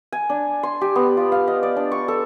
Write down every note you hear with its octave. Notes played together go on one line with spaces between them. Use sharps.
G#5
D4
C6
G4
B3
F4
F5
D#5
D5
D4
C#6
A4